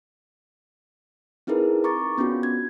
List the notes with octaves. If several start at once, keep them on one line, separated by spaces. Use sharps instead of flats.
C4 D#4 E4 G#4 A#4 B4
A#5 C#6 D6 A6
B3 C#4 D4 F4 F#4
G#6